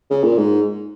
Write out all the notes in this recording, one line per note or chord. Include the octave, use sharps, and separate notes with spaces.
C#3
A#2
G#2